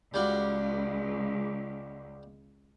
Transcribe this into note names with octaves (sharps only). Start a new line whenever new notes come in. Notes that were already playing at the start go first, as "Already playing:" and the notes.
C#2 G3 F4 F#4